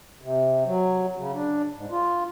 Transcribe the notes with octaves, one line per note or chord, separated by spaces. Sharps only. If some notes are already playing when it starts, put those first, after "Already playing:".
C3
F#3
C#3
D4
G#2
F4